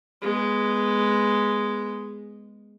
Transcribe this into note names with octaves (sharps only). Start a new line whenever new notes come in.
G#3 B3